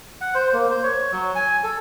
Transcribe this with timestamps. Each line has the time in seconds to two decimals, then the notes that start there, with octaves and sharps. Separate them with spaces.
0.21 F#5
0.35 C5
0.53 A#3
0.70 C5
0.83 C#5
1.12 F#3
1.35 G#5
1.64 A4